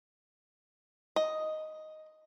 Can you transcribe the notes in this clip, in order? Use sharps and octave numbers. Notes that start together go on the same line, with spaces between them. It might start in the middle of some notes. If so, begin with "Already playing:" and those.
D#5